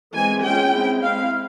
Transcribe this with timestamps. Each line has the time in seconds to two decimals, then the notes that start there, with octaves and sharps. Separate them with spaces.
0.13 E3 G#3 C4 G#5
0.42 G#3 C#4 F4 G5
0.72 G#3 C4 E4
1.01 G#3 C4 E4 F5